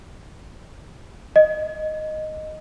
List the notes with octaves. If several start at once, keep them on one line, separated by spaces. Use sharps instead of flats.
D#5